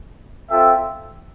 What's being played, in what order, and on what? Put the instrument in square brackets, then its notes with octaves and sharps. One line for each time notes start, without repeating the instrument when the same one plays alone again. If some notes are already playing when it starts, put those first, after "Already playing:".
[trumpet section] C4 F4 A4 E5 G5